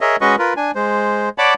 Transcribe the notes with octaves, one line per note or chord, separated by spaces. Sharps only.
G#4 A#4 C#5 D#5 E5
G#3 C#4 F#4 B4 D#5 C#6
F4 A#4 B4
D4 G#5
G#3 C5
C#5 D5 F#5 A5 B5 D6